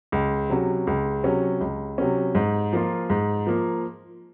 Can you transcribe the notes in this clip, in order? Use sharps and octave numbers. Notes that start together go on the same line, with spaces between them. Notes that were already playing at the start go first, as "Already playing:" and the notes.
C#2
C3 F#3 C#4
C#2
C3 F#3 C#4
C#2
C3 F#3 C#4
G#2
F3 A#3 F4
G#2
F3 A#3